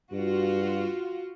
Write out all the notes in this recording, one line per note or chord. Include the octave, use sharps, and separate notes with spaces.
G2 F4 F#4